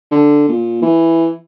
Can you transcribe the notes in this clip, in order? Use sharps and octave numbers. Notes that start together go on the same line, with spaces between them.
D3
A#2
E3